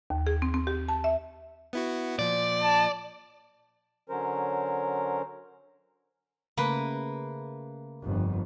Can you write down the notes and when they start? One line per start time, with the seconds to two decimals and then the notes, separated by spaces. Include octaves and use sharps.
0.10 D#2
0.27 G#4
0.42 C4
0.54 C4
0.67 G4
0.89 A5
1.04 E5
1.73 B3 E4 F#4
2.19 A#2 F3 D5
2.63 A5
4.09 D3 F#3 C#4 A#4 C5
6.57 C#3 A3 A#3 B4
8.02 G1 F2